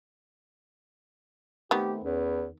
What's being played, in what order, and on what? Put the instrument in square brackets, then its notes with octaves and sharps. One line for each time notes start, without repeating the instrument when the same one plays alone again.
[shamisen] D#3 B3 [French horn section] A3 C4 [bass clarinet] G4
[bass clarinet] E2 [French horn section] C#4 B4